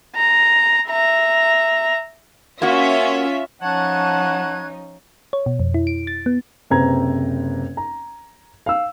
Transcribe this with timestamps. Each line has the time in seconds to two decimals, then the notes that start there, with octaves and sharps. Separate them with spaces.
0.15 A#5
0.88 E5 A#5
2.62 A#3 C#4 F4 F#4 E5
3.62 F3 C#4 D#4 F#5 A5 C#6 F#6 G#6
5.33 C#5
5.46 B2
5.60 F2
5.74 E4
5.87 D7
6.07 A6
6.26 B3
6.70 F#1 C3 B4 C5 A#5 G#6
7.77 A#5
8.66 F5 E6